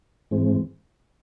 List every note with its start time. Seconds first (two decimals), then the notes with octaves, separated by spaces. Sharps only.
0.31 G#2 E3 G#3 C4